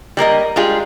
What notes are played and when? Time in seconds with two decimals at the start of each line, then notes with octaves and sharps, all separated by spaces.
0.17 G3 A#3 A#4 D#5
0.56 G3 G#3 F4 G#4